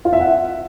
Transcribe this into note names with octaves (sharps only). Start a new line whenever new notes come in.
F4
E5
F#5